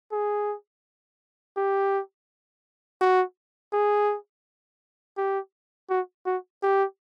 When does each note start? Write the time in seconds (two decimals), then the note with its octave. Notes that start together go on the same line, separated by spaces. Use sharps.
0.12 G#4
1.57 G4
3.01 F#4
3.73 G#4
5.17 G4
5.90 F#4
6.26 F#4
6.63 G4